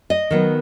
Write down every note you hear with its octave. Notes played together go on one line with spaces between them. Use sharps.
D#5
D#3 F#3 B3